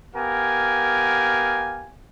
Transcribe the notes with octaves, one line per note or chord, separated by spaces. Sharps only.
B3 G4 A#4 F5 G#5